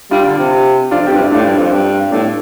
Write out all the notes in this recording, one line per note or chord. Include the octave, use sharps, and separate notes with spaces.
G3 D4 F4
D3
C3
F2 D4 F4
F2 G4
G2 D4 F4
E4 G4
A2 D4 F4
G2
F2
G2
A2 B3 D4